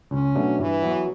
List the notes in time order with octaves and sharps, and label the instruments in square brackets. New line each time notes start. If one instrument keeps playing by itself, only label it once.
[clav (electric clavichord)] C#2 [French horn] C#4
[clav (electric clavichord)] B2 F#3 A3 D4
[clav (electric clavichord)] G2 [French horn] E3
[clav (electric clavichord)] F#3 B3 F#4